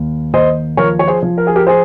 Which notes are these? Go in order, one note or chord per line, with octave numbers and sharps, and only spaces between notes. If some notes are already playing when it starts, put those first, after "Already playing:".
Already playing: D#2
D#2 C5 D#5
F3 A#4 C#5
C#5
G#4 C5
F3
A#4
G#4
G4 A#4
G#4 C5